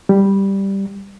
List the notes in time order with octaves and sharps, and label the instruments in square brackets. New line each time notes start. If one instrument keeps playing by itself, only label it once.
[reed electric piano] G3